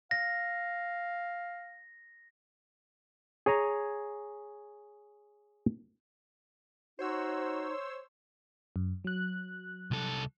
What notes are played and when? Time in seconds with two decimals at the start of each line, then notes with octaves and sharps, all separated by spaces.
0.11 F5 A#6
3.46 G#4 C#5 G#5 A#5
6.99 D#4 F#4 C5 C#5 E6
8.76 F#2
9.04 F#3 F#6
9.91 C2 A4